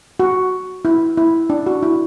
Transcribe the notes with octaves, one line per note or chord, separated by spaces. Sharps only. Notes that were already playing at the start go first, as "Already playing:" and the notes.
F#4
E4
E4
D4
F#4
E4